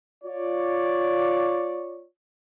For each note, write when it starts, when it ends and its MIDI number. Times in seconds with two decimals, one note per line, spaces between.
0.24 2.06 65
0.24 2.06 73
0.24 2.06 74